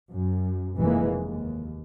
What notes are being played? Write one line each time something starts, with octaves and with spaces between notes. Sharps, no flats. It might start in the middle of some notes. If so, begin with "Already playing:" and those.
F#2
F1 E3 G#3 A#3
D#2